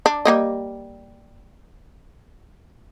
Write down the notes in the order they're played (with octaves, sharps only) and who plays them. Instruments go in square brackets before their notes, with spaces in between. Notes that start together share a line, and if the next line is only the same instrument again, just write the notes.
[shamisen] D4
G3 A#3 D#5